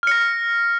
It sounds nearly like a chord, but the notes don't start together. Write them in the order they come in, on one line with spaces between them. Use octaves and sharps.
F6 C#7 A#6